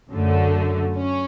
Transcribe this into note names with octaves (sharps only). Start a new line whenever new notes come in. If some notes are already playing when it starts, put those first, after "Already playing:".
F#2 D3 A3
C#4